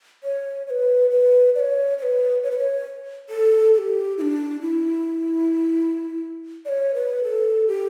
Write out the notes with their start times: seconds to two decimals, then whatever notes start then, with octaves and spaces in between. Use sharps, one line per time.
0.24 C#5
0.67 C#5
0.70 B4
1.11 B4
1.55 D5
1.59 C#5
1.98 C#5
2.03 B4
2.43 C#5
2.51 B4
2.58 C#5
3.29 A4
3.74 A4
3.78 G4
4.18 E4
4.21 D4
4.61 E4
6.65 D5
6.69 C#5
6.94 B4
7.24 A4
7.68 G4